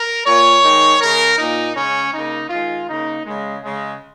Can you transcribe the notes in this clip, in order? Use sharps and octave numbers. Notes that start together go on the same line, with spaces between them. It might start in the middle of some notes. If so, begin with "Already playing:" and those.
Already playing: A#4
A#2 A#3 C#5
D#3 G#3
C#3 G#3 A#4
A#2 A#3 D#4
C#3 G#3 C#4
C#3 A#3 D#4
D#3 G#3 F4
C#3 A#3 D#4
C#3 G#3
C#3 G#3